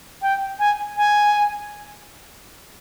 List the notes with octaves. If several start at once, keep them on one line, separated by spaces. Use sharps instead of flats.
G5
G#5
G#5